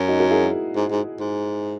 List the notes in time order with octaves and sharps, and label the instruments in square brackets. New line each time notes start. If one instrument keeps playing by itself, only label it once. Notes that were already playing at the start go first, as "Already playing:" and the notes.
Already playing: [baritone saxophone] F#2
[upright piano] D#4 F#4
F#4 A#4
E4 G#4
[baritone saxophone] G#2
G#2
G#2